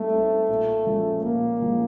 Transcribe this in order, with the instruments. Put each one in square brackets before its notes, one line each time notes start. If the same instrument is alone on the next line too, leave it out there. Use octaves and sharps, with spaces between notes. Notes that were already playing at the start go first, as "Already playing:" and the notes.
Already playing: [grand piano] G3 C4 D#4 [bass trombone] A3
[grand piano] C4 D#4
A#2
F3 G#3 C#4
[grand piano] A#2 [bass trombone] A#3
[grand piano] F3 G#3 C#4